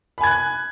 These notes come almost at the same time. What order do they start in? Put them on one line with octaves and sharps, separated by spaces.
B5 G#5 G#6 F#6